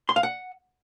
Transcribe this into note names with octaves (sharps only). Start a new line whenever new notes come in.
C6
F5
F#5